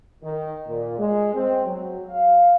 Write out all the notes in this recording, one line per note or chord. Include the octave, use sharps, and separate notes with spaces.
D#3
A#2
G#3
C4
F#3
F5